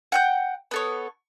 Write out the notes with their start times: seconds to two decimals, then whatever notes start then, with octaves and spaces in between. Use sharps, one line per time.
0.12 F#5 G5 G6
0.71 B3 A4 C#5